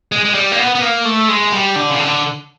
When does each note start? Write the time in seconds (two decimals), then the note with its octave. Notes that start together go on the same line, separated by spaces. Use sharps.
0.12 G#3
0.25 G#3
0.34 G3
0.52 A#3
0.59 B3
0.75 B3
0.82 A#3
1.05 A3
1.28 G#3
1.52 G3
1.76 D3
1.90 C#3
1.99 D3